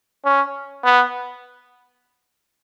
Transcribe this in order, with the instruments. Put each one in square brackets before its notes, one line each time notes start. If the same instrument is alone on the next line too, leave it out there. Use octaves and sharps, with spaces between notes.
[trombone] C#4
B3